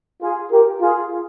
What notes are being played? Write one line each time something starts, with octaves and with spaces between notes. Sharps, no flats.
F4 G#4
G4 A#4
F4 G#4